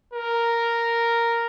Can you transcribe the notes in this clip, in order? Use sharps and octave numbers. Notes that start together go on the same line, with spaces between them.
A#4